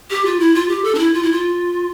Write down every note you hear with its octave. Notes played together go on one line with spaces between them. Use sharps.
G4
F4
E4
F4
G4
A4
D4
E4
F4
E4
F4